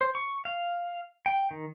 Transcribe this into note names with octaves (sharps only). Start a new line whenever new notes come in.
C5
C#6
F5
G5
D#3